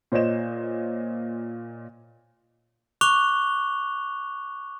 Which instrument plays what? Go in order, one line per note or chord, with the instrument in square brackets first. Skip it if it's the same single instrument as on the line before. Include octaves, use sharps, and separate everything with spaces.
[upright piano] A#2 C5 C#5 D#5 E7
[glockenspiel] C#6 D6 F#6 F7 G7